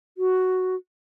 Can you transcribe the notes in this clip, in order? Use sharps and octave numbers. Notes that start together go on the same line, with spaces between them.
F#4